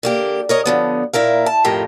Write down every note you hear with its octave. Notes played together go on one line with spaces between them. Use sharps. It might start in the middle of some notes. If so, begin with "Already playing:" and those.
D3 A#3 G4
A#4 C#5 D#5
D3 F3 B3
A#2 E4 A#4 F5
A5
F2 A2 F4 G4 A#4